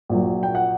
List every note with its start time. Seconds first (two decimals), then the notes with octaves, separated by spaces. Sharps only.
0.09 A#1 A#2 F#3
0.43 G5
0.55 F#5